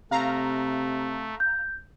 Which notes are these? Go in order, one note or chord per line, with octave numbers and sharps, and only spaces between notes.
C3 A3 F5 A#5
G6